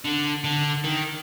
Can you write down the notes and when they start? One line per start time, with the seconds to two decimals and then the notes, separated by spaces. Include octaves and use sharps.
0.05 D3
0.44 D3
0.84 D#3